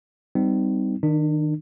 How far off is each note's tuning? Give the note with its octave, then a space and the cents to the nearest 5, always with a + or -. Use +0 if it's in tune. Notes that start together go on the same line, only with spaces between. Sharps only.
G3 +0 C4 -30 D#4 +0
D#3 +0 D4 +40